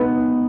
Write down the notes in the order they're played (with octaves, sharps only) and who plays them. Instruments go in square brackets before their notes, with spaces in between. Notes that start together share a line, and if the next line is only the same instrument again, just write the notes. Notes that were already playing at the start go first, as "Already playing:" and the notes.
Already playing: [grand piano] B2 B3 D#4